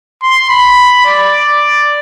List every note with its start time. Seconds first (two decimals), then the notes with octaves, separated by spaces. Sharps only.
0.22 C6
0.49 B5
1.06 D5